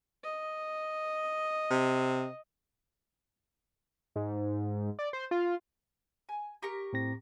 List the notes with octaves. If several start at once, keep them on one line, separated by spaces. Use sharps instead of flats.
D#5
C3
G#2
D5
C5
F4
G#5
G4 A#4 C#6
A2 C4 A#6